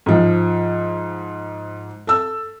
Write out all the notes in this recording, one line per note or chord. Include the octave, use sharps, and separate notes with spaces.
G#2 F3
A4 E6